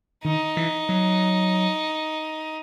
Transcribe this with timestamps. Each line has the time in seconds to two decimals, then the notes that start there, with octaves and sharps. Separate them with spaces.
0.25 D#3 D#4
0.57 E3
0.89 F#3